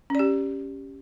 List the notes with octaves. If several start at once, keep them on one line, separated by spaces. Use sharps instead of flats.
C#4 G4 D5